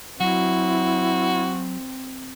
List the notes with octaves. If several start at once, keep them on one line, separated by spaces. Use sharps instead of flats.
F#3 C4 E4 F#4